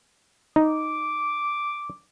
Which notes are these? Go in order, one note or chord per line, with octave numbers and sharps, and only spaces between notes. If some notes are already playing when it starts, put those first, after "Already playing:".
D#4 D6